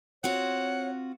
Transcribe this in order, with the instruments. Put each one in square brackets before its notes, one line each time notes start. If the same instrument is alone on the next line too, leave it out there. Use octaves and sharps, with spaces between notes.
[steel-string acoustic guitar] C4 F4 F#4 [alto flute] C#5 [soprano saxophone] F#5